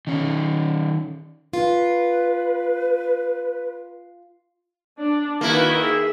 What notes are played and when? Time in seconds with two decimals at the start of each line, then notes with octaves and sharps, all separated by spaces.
0.07 D#3 C#4
1.53 F4 B4
5.00 D4
5.41 D#3 A#3 E4 F#4 B4
5.77 G#4 E5